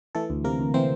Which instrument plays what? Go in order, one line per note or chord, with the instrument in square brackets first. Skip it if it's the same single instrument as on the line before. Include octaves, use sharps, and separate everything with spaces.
[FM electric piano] E3 A3 A4
D2
C3 A#3 A#4
D2
E3 C4 C5